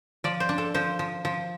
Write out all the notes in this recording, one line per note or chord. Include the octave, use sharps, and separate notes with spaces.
F3 D5
C5
D4
A4
F3 C5
F3
F3